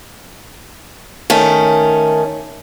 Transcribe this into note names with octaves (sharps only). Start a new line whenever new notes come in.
D#3 A3 C#4